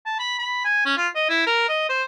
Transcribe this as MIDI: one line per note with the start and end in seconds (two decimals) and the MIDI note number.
0.06 0.15 81
0.19 0.38 83
0.39 0.64 83
0.65 0.84 80
0.85 0.96 61
0.97 1.08 65
1.15 1.26 75
1.29 1.42 64
1.46 1.65 70
1.69 1.88 75
1.89 2.03 72